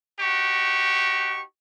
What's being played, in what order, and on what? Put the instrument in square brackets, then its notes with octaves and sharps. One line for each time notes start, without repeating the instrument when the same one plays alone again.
[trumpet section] D#4 F#4 G4 C#6